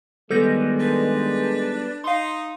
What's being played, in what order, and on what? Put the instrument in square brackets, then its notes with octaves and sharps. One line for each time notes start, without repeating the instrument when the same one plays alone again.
[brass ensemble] D#3 G#3 [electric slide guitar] G3 B3 [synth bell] A4 G6 A#6
[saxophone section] D4 B4
[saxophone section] D#4 [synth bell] F5 C6